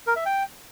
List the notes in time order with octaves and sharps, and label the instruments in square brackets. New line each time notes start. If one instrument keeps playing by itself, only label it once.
[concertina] A#4
E5
G5